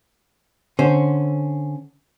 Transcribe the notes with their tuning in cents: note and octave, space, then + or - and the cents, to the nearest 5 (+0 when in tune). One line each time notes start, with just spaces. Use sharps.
D3 +5 C#4 +0 C5 +0